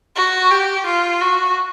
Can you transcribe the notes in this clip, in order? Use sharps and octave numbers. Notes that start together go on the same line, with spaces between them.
F#4
G4
F4
F#4